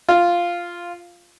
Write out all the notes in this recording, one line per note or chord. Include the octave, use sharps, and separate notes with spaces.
F4